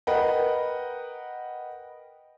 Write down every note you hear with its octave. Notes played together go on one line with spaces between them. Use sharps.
A#4 B4 D#5 F#5 G5